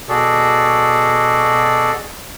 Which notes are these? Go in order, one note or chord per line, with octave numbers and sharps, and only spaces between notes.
B2 F#4 G#4 A4 D5